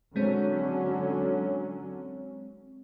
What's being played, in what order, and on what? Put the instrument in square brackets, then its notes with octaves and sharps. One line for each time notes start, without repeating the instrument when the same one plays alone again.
[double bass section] D3 F#3 C#4 [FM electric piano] G#3 C4